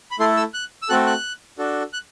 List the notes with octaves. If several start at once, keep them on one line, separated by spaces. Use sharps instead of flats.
B5
A3 E4 A4 C6
E6
F#6
E6
A3 C4 F#4 A4 F#6
F#6
D4 F#4 A4
F#6